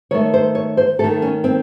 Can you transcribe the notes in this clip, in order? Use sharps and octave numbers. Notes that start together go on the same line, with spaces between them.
D#3 A3 C#5
C5
C#5
C5
D#3 A3 A4
C#4
C4